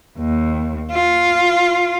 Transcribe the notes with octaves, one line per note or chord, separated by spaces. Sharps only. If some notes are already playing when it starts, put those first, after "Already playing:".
D#2
F4